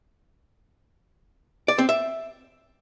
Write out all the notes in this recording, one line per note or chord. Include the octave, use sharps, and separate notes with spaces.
D5
C4
E5